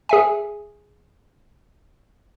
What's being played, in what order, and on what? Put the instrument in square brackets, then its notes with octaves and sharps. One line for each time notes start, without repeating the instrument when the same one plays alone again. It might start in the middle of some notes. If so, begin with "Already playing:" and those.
[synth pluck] G#4 E5 G#5